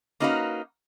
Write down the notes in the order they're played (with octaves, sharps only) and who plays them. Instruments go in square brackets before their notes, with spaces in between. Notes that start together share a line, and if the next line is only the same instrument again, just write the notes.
[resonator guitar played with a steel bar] A#3 C#4 D#4 F#4 B4 F5